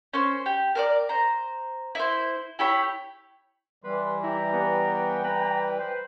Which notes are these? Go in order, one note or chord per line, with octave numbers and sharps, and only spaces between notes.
C#4 C5
G4
A#4 C5 D5
C5 A#5
E4 C5
E4 G4 C#5 B5
E3 G3 B4 C6
E4 G4 A#5
B3 G4
G5
B4 A#5
C5